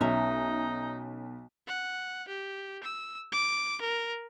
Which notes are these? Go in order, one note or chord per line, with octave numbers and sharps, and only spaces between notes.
B1 C#4 D#4 E5 A#5
F#5
G4
E6
D6
A#4